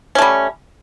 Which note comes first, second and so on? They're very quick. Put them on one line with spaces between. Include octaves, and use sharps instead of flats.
C#4 A3 G3